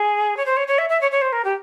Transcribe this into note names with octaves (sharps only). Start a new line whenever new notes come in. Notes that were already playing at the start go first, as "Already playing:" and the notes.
Already playing: G#4
C#5
C5
C#5
C#5
E5
E5
C#5
C#5
C5
A#4
G4